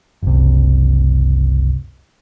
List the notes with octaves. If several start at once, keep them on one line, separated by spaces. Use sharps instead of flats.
F#1 C2